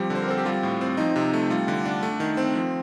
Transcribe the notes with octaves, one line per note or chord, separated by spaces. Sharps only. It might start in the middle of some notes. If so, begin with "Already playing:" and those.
Already playing: F3 G3 C4 G4
D3
C5
A#4
C4 A4
G4
G3 F4
A2
C4
F3 D#4
C3
A3
G3 F4
D3
D4
A3
D#3
C4
F3